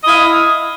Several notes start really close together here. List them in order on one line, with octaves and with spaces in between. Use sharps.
D#5 E4 F5